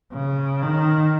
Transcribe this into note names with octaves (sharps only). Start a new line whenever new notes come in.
C#3
D#3